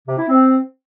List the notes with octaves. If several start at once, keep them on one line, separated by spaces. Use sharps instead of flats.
C3
E4
C4